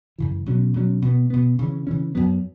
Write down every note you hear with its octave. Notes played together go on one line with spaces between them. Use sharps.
F#2 C#3 E3
B2 F#3 C#4
B2 F#3 C#4
B2 B3
B2 B3
C#3 E3 C#4
C#3 E3 C#4
F#2 F#3 B3